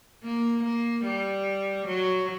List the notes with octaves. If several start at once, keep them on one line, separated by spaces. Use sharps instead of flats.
A#3
A#3
G3
F#3